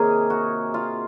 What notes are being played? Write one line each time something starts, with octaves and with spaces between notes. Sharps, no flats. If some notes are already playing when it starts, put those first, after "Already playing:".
Already playing: C3 D#3 A#3 G#4 A#4 C#5
F#4
F4